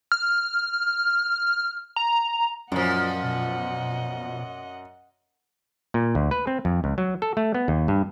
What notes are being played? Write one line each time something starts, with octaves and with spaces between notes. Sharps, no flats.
F6
A#5
F#2 A#2 F3 D#5 F#5
B2
A#2
D2
B4
C4
F2
C#2
F#3
A4
A3
B3
D#2
G2